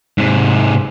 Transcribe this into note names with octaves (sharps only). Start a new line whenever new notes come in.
G#2 C3